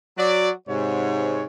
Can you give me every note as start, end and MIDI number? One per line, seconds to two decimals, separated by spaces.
0.18 0.51 54
0.18 0.51 66
0.18 0.51 74
0.68 1.44 44
0.68 1.44 48
0.68 1.44 73